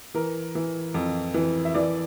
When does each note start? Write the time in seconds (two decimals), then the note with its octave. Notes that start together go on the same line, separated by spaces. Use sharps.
0.14 E3 A#4
0.55 E3
0.94 F2
1.34 E3
1.65 E5
1.74 E3 D5